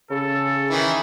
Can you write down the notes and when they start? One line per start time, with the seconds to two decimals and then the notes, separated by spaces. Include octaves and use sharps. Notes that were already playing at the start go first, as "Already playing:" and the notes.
0.10 C#3 A4
0.71 D#3 E3